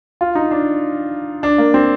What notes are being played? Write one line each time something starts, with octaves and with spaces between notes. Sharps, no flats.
F4
D#4
D4
D4
A#3
C4